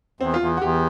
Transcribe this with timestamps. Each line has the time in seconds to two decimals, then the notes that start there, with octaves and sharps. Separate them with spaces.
0.20 E2 C4
0.34 F4
0.40 E2
0.57 F#4
0.61 E2 G4